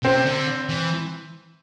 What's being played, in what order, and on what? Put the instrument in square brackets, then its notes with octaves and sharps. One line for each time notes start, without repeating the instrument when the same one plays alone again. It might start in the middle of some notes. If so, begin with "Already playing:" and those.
[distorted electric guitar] C3 [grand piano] C4
[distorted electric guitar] D3
E3